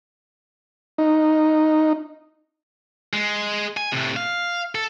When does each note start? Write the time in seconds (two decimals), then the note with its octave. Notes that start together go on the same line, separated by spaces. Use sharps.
0.98 D#4
3.14 G#3
3.77 G#5
3.93 A2 C3
4.16 F5
4.75 A4